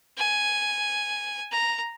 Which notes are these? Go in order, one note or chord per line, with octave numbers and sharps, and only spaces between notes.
G#5
A#5